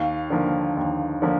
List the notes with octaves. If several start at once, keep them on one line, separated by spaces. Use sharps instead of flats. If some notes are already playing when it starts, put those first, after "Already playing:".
Already playing: D#2 F5
D3 F3 A#3
D#2
D3 F3 A#3